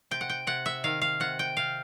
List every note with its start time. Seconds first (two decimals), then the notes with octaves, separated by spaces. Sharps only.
0.11 C3 G5
0.21 F#5
0.29 G5
0.47 C3 F#5
0.66 E5
0.84 D#3 F5
1.02 F5
1.20 C3 F#5
1.39 G5
1.57 C3 F5